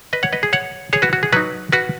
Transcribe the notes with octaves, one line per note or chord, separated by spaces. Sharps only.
B4 D#5
C#5 F#5
B4 D#5
G#4
C#5 F#5
G#4 C#5
F#4 B4
F#4
G#4
F#3 D#4 F#4 B4
F#4 B4